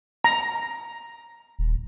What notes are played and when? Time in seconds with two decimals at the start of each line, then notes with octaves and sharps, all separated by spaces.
0.24 A#5
1.59 D#1